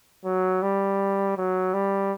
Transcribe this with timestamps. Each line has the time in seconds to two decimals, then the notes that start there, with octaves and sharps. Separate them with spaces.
0.25 F#3
0.62 G3
1.38 F#3
1.74 G3